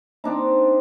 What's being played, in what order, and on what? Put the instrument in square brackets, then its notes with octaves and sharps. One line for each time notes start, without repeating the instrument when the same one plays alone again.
[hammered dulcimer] C4 D4 D#4